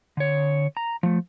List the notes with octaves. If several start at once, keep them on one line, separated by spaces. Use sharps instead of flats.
D3 C#5
A#5
F3 A3